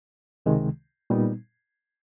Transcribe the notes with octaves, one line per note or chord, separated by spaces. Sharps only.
C#2 C3 D#3 G#3
A#2 G3 B3 D#4